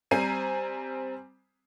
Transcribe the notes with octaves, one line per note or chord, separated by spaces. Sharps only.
G3 C4 G#5 A#5 C7 D#7